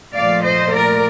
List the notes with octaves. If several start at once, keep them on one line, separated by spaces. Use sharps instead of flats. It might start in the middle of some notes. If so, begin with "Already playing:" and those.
A#2 F3 A3 D5 F5
C5 D#5
A#4 D5